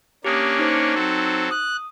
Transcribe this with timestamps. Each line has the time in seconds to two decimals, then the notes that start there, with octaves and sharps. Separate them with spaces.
0.25 A#3 C#4 D4 G4 D#6
0.59 D#4 C5 C#7
0.95 F#3 C4 A4
1.51 D#6 F#6